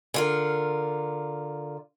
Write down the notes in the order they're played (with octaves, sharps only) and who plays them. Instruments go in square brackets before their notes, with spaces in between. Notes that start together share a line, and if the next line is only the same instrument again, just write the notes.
[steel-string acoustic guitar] D3 F4 A#4